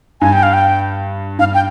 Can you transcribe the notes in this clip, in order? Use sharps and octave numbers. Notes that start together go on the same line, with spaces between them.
G2 G#5
G5
F5
G5
G2 F5
G5